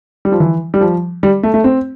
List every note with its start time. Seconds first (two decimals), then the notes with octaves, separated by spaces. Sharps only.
0.25 G3
0.32 F3
0.40 E3
0.74 G3
0.81 F3
1.23 G3
1.43 A3
1.54 A3
1.64 C4